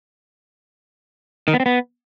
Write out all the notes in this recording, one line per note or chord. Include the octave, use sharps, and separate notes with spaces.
D#3
B3
C4
B3